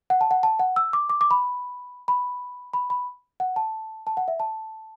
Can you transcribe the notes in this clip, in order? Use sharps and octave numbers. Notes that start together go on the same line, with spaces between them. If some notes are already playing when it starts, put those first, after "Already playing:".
F#5
A5
F#5
A5
F#5
E6
D6
D6
D6
B5
B5
B5
B5
F#5
A5
A5
F#5
E5
A5